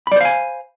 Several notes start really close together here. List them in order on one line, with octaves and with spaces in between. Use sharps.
B5 D5 C5 F5 G#5